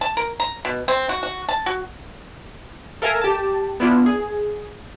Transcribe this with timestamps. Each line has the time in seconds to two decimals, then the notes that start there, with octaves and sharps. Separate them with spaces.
0.01 A5
0.17 A#4
0.40 A#5
0.65 B2
0.88 C4
1.09 F#4
1.23 F#4
1.49 A5
1.66 F#4
3.02 A4 A#4 E5 F5 G#5 A#5
3.22 G4 A5
3.80 B3 D4 E4 F4
4.06 G#4